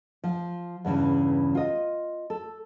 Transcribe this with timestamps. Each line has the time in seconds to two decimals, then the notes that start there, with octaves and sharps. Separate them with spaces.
0.24 F3
0.85 E2 G2 C#3 E3
1.55 F4 D#5
2.30 A4